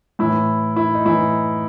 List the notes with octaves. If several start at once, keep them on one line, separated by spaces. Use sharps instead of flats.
A2 E3 E4
E4
D#4
A2 E3 E4